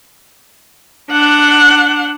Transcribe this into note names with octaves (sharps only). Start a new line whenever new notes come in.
D4 F#5